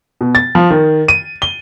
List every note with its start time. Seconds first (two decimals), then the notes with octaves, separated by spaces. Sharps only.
0.21 B2
0.35 A6
0.55 F3
0.70 D#3
1.08 D#7
1.42 G7